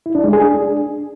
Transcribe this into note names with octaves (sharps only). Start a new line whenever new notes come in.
E4
D4
G#3
G#4
D4